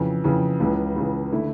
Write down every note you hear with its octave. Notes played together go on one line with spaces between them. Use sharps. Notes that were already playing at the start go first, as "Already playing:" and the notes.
Already playing: F2 C#3 E3
F2 C#3 E3
C#2 C#3 E3
C#2 C#3 E3
D3 A3 E4